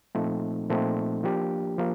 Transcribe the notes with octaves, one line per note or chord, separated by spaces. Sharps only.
A#2 F3 A3 C4 D#4
A#2 F3 A3 C4 D#4
F3 A#3 D4 G4
F3 A#3